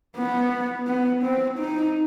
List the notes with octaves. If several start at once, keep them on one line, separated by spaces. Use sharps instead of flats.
B3
B3
C4
D#4